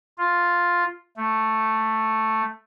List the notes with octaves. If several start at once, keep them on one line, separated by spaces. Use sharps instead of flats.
F4
A3